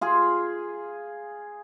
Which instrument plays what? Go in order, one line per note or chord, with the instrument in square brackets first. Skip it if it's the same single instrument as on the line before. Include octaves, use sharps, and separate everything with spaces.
[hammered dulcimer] F4 G#4